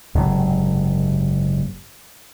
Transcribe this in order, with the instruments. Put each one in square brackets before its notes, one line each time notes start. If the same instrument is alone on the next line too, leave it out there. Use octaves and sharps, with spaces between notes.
[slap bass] F#1 G#2 C3